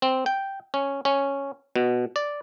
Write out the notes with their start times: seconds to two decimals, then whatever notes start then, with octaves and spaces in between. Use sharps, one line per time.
0.02 C4
0.26 G5
0.74 C#4
1.05 C#4
1.76 B2
2.16 D5